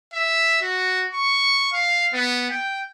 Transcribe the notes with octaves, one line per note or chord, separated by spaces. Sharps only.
E5
F#4
C#6
F5
B3
G5